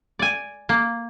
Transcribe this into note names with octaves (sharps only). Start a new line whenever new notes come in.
D5 G#5
A#3